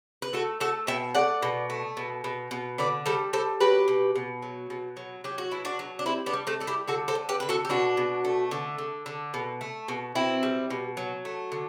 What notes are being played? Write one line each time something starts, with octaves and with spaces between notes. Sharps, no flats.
B4
A3 F#4 A4
A3 F#4 A4
B2 E5 G5
A3 D5 F#5
B2
A3
B2
B2
B2
D3 B4 D5
G3 A4 C5
G3 A4 C5
F#3 G4 B4
B2
B2
F#3
B2
F#3
F#3 G4
F#4
B2 E4
D4 F#4
F#3
D4
G3 C4 E4
B3 D4
G3
A3 C4
G3 A4
E4 G4
D3 F#4 A4
A4 C5
D3
G4 B4
D3 B4
F#4 A4
G4
B2 D4 F#4
B2
A3
D3
D3
D3
B2
A3
B2
B2 C4 E4
G3
B2
F#3
A3
D3